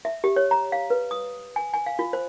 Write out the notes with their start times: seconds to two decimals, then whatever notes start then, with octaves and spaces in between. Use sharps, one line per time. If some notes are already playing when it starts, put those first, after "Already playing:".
0.05 E5
0.24 G4
0.36 C#5
0.51 A#5
0.72 F5
0.90 B4
1.11 D#6
1.56 G#5
1.74 G#5
1.86 F5
1.99 F4
2.13 C5